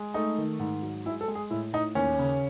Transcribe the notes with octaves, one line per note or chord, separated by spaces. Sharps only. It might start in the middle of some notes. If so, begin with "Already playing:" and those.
Already playing: G#3
A3 D#4
D#3
G#2
F#3
G#3 E4
A4
G#3
G#4
A2 E4
A2 D#4
D#2 C#4
C#3